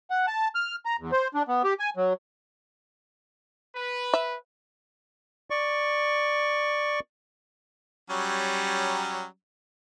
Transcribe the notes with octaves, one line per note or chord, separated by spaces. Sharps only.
F#5
A5
F6
A#5
E2
C5
D4
B3
G4
G#5
F#3
B4
E5
D5 C#6
F#3 G3 C#4